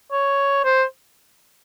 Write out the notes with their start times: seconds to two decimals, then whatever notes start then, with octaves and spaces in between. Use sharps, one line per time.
0.12 C#5
0.64 C5